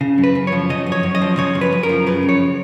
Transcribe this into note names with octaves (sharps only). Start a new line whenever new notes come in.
C#3
F#2
B4
F#2
F3 C#5
C#3 D#5
F#2
C#5
F#2
D#5
F3
C#3 C#5
F#2
B4
F#2
A#4
F3
C#3 B4
F#2
C#5